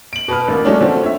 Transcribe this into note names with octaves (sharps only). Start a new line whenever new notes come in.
D7 F#7
B2 B4 F6
A1 A#3
F#3 G#3 A3 C#4 D4
D3 F3 A3 C4 C#4
C#5 E5